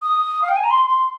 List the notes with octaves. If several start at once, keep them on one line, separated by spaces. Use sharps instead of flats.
D#6
F5
G5
G#5
A#5
C6
C6